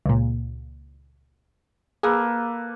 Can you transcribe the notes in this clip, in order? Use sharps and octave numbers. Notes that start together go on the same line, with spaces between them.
C#2 A#2
A#3 G#4 A4 B4